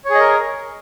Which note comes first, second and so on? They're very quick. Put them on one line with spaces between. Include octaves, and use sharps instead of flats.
C#5 G#4 D#5 A#4